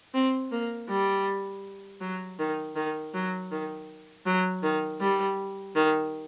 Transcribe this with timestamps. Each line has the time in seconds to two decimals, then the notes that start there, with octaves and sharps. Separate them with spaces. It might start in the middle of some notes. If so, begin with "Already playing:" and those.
0.14 C4
0.52 A#3
0.89 G3
2.01 F#3
2.39 D#3
2.76 D#3
3.14 F#3
3.51 D#3
4.26 F#3
4.63 D#3
5.00 G3
5.75 D#3